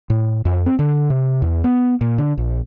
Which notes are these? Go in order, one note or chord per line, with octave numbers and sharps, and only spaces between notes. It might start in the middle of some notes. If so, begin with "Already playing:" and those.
A2
F2
C4
D3
C3
E2
B3
A#2
D3
A#1